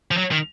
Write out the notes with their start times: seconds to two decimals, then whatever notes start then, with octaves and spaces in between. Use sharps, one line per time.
0.11 F3
0.17 F#3
0.32 D#3